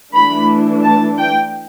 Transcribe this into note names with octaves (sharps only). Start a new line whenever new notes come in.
E3 A3 D4 B5
A5
G5